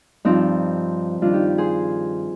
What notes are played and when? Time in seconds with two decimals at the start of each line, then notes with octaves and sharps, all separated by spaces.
0.25 G2 F3 C4 D#4
1.22 G2 D#3 D4 F4
1.34 D#4 G4
1.58 G#4 C5